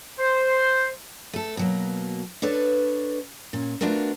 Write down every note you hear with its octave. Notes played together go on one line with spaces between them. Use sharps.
C5
A3 A4
B2 F#3 A#3
D4 A4 B4 C#5
A#2 C#4
A3 B3 D4 F4 F#4 A#4